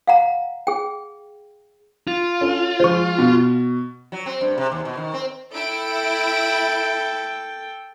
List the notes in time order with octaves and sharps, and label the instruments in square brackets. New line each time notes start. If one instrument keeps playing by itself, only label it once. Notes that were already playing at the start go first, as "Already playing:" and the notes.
[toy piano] F5 F#5 A#5
G#4 G5
[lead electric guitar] F4
[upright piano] C#4 A4
[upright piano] F3 G#3 [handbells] C5 C#6
[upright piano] B2
[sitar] F#3
C4
G2
C3
D#2
B2
D#3
C4
[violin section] E4 D7 [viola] A4 G5